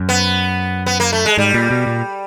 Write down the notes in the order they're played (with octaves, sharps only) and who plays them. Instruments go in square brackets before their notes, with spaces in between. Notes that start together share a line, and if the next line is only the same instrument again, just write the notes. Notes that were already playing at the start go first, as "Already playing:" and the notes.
Already playing: [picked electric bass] F#2
[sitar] B3
B3
A#3
A3
G#3
[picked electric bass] G#2 [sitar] G3
[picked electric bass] A#2
B2
A#2